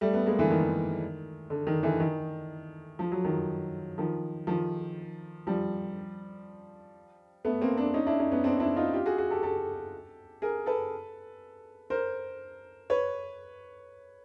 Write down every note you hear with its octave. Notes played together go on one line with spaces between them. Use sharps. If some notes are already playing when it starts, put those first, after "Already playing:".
G3 A3
A3 B3
G#3 A#3
D3 E3
D#3
D3
D#3
D3 E3
D#3
F3
F#3
D#3 F3
D#3 F3
D#3 F3
F3 G3
A3 B3
A#3 C4
C4 D4
C#4 D#4
D4 E4
C#4 D#4
B3 C#4
C4 D4
D4 E4
D#4 F4
F4 G4
F#4 G#4
F#4 G#4
G4 A4
G4 A4
G#4 A#4
A4 B4
A#4 C5
B4 C#5